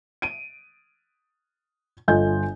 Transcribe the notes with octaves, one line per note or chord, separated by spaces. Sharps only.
D7 D#7
G1 F4 A4 D#5 G#5 G6